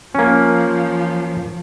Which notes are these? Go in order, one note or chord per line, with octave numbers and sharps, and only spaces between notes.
F3 A#3 C#4